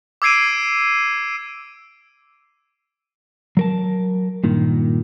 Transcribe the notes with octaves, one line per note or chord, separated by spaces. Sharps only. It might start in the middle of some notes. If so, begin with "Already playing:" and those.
D6 E6 G#6 C7 D7 D#7
F#3 A#4 A5
G2 A#2 D#3